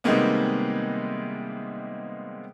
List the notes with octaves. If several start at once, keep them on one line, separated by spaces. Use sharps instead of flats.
C3 D#3 G3 G#3 A#3 B3